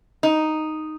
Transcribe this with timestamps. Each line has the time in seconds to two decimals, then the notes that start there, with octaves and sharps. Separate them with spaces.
0.23 D#4